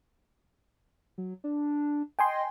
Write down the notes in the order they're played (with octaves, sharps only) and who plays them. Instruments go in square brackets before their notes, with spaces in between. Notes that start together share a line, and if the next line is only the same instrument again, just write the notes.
[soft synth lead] F#3
D4
[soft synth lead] D#5 [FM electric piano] G5 G#5 C6